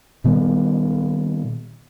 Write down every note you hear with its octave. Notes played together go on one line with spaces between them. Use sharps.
A#2 D#3 G3 B3